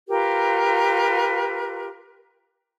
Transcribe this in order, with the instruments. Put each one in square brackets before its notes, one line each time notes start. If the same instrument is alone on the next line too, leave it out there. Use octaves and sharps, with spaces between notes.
[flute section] F4 G4 A#4 B4